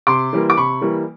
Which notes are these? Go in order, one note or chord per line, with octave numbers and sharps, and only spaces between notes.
C3 C6 D6
E3 G3 A#3
D6
C3 B5 C#6
E3 G3 A#3